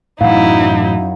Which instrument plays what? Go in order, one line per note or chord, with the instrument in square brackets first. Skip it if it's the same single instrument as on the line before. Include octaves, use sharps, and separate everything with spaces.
[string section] F#2 [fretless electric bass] A2 E3 [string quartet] D#4 E4 [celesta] F5 F#5